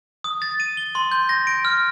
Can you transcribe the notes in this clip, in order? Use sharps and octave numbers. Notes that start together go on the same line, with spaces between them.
D#6
A6
D#7
G7
C6
G6
A#6
D7
F6